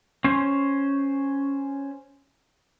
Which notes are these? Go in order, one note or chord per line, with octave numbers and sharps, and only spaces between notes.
C#4 C5